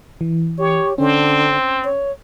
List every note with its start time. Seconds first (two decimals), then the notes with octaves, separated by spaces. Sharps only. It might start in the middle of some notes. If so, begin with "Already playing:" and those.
0.21 E3
0.58 G4 C#5
0.98 D3 C4 C#4
1.84 C#5